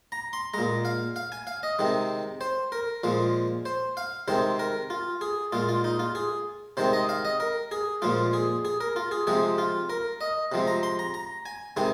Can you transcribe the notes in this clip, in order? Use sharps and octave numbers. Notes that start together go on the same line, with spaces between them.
A#5
C6
A#2 G#3 A#5
F5
F5
G#5
F5
D#5
C3 D#3 G#3
C5
A#4
A#2 F3 G#3
C5
F5
C3 D#3 G#3 C5
A#4
F4
G#4
A#2 G#3 F4
F4
D#4
F4
G#4
C3 D#3 G#3 C5
D#5
F5
D#5
A#4
G#4
A#2 F3 G#3 F4
G#4
G#4
A#4
F4
G#4
C3 F3 G#3 G#4
F4
A#4
D#5
C3 F3 G#3
A#5
C6
A#5
A#5
G#5
C3 D#3 G#3 G#5